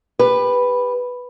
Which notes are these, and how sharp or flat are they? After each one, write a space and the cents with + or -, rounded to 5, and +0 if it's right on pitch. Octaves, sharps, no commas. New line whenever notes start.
G4 +30 B4 +0